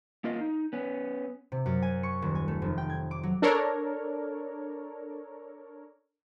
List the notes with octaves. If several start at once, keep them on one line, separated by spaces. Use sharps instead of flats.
A#3 F4 A#4 D#5 F5
D#4
B3 C#4
C3
F#2
G#5
C#6
D#1
G#5
A3
F1
G5
G#6
D6
F#3
D4 A4 A#4 C#5